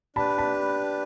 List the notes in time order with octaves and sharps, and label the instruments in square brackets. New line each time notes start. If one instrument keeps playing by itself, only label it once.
[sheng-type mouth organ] D4 G4 B4 [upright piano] A5 B5
[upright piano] A5 B5